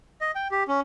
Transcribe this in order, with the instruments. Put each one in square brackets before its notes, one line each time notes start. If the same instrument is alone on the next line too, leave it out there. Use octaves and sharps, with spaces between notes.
[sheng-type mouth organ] D#5
G5
G4
C#4